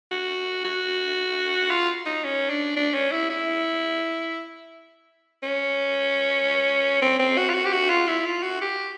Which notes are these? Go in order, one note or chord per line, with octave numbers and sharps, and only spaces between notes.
F#4
F#4
F4
D#4
C#4
D4
D4
C#4
E4
E4
C#4
C4
C4
F#4
F4
F#4
G4
F#4
F4
E4
F4
F#4
G4